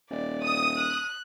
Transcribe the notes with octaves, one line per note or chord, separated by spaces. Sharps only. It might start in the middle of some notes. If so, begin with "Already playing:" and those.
D#1 D5
D#6
F#6